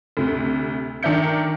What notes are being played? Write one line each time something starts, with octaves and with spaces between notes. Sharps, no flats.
D2 C3
D#3 D4 A#4 E5 G6 C#7